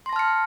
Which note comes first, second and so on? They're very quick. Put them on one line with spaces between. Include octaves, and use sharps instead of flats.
C6 A#6 A5 F6 C#7